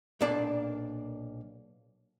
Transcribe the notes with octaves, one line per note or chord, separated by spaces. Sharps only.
B1 A#2 A#3 D4 D5 A5